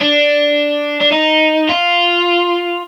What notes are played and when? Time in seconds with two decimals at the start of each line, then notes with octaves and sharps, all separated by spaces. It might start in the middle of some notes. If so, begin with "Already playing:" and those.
0.01 D4
1.01 D4
1.12 D#4
1.69 F4